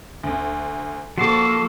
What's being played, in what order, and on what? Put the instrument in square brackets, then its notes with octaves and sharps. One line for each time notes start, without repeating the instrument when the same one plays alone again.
[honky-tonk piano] D2
[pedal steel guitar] F3 C5 D6 [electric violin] A#3 A4 [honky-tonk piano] F#4 C#6